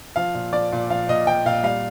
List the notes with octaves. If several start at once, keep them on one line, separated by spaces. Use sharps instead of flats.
F3 F5
A#2
F3 D5
A#2
F3 F5
A#2 D#5
F3 G5
A#2 F5
G3 F5